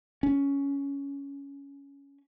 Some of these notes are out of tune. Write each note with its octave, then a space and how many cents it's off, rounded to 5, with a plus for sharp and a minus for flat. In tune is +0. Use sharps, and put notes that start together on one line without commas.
C#4 +10